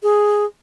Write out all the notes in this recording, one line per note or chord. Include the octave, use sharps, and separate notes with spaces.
G#4